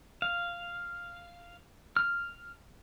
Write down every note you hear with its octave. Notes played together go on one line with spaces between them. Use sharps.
F5
F6